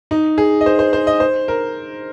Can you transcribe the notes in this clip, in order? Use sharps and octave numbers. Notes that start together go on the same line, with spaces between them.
D#4
G#4
D#5
C5
C5
C5
D#5
C5
A#4